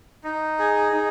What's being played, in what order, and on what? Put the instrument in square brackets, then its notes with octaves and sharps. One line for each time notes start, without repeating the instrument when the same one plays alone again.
[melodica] D#4
G#4
D#4